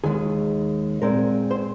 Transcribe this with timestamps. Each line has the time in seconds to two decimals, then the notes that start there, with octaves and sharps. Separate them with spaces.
0.04 D#2 D#3 G#3 G#4
1.02 A#2 G#3 C4 A#4
1.51 C5